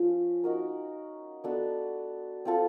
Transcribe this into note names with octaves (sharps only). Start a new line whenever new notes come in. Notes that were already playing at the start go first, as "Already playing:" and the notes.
Already playing: F3 C#4
D#4 F#4 A#4
B3 D4 F#4 A4
C4 F4 A4